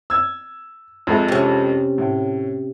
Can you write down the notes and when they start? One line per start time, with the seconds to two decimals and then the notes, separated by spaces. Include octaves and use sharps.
0.10 E6 G#6
1.07 F2 G#3 A3
1.28 C3 C#4
1.98 A2